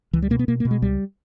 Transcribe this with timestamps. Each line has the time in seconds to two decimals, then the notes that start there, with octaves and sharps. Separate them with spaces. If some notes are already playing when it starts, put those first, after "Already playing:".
0.13 C#2 E3
0.22 G3
0.30 B2 A#3
0.39 B3
0.48 B2 A#3
0.60 A#3
0.65 B2
0.71 G#3
0.82 C#2 G3